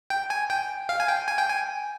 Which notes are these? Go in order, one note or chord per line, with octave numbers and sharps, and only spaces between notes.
G5
G#5
G5
F5
G#5
G5
G#5
G5
G#5